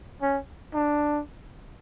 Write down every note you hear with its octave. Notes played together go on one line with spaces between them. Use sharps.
C#4
D4